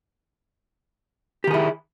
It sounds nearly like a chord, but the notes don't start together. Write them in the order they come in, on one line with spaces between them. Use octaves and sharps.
G4 D#3 G#4 E4